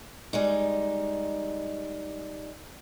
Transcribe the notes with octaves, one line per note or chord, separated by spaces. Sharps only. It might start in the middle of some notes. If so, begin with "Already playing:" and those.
G3 G#3 D#4